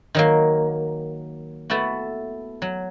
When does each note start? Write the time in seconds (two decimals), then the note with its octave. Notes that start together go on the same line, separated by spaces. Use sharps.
0.15 D#3 F#3 A#3
1.70 A3 B3 E4 F#4
2.62 F#3